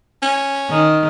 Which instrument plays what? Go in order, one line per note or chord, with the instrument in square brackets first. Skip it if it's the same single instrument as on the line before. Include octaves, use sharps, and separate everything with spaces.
[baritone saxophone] C#4
[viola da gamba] D#3